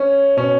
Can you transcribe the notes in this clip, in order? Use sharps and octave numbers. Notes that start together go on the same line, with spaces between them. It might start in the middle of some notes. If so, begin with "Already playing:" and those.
Already playing: C#4
B2 C#4